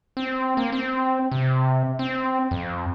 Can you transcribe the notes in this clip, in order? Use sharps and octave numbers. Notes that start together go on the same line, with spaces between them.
C4
A#3
C4
C3
C4
F2